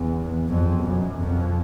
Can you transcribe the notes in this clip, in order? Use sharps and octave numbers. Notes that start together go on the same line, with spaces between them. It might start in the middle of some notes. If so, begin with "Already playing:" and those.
Already playing: E2
F2
F#2
F2